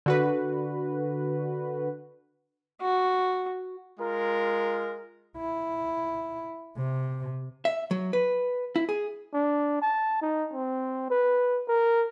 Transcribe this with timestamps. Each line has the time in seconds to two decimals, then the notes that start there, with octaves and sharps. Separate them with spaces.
0.06 D3 F#4 B4
2.81 F#4
3.99 G#3 F4 A#4
5.38 E4
6.77 C3
7.65 E5
7.91 F#3
8.13 B4
8.76 E4
8.89 G#4
9.34 D4
9.82 A5
10.21 D#4
10.53 C4
11.10 B4
11.68 A#4